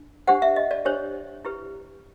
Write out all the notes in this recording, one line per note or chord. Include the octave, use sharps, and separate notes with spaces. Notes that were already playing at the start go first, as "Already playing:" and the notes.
Already playing: D4
D4 G4 C5 F#5
E5
D#5
D5
D4 G4 C5 C#5
E4 G4 B4